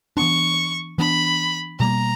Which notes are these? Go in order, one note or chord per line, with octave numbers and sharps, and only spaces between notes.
E3 B3 D4 C#6
E3 B3 D4 B5
B2 G3 A#3 A#5